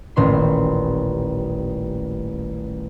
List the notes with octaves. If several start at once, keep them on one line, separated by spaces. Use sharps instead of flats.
D#1 A1 C6 C7